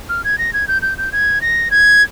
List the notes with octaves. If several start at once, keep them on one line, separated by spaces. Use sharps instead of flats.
F6
G#6
A#6
G#6
G6
G6
G6
G#6
A#6
G#6